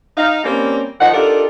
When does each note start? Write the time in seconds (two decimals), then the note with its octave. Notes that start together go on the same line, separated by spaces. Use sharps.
0.17 D#4 F5
0.44 G3 A#3 C4 C#4
1.00 D#3 F3 D#4 F#5
1.14 D4 D#4 F4 G4 A4 A#4